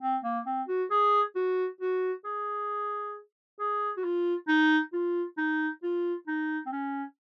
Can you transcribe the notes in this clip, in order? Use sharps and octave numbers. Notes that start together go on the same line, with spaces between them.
C4
A#3
C4
F#4
G#4
F#4
F#4
G#4
G#4
F#4
F4
D#4
F4
D#4
F4
D#4
C4
C#4